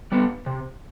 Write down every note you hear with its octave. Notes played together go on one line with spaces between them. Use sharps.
G3 B3
C3